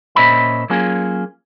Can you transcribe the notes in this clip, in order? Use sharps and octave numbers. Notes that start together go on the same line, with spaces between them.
A#2 C#4 C5 D#5 E5 B5
F#3 A#3 C#4 F4 G#4